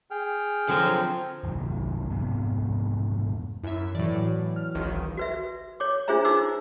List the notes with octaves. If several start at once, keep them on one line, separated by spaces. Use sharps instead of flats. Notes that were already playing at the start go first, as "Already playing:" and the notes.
G#4 G5 F6
D3 F3 F#3 C4
G1 C2 D#3 F#3
F2 G#2 C3 B3
F#2 E4 E5
A2 E3 F#3 D5
F6
G#1 C#2 D#3
F#4 B4 E5
C#5 D6
D4 F4 G#4 C5 E5 A#5
D#4 B4 D6 E6